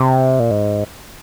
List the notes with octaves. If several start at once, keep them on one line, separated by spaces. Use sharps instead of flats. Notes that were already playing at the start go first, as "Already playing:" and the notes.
Already playing: C3
A#2
G#2